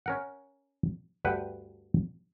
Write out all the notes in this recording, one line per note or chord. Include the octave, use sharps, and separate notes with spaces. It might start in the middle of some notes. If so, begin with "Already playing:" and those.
C#4 A#4 F#5
D2 G2 B4 F#5 G5